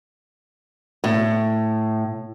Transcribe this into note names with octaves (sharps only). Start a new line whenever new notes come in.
A2